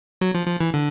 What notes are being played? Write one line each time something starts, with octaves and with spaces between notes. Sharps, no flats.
F#3
F3
F3
E3
D3